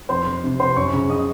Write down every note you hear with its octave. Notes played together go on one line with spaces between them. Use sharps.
F2 C5 C6
F2
C3
C3 C5 C6
F#2 C#5 C#6
C#3
C#3 D#5 D#6